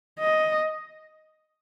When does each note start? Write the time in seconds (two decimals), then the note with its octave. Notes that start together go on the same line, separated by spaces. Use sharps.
0.20 D#5